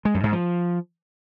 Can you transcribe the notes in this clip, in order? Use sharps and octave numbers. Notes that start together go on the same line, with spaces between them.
G#3
F#2
G#2
F3